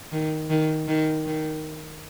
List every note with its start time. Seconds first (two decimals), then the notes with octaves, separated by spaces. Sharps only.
0.12 D#3
0.50 D#3
0.88 D#3
1.26 D#3